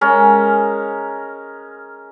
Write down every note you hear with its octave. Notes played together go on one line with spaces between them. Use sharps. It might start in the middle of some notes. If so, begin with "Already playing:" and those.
G#3 C#4 A#4